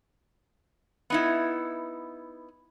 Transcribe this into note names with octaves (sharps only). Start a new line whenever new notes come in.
B3 D#4 E4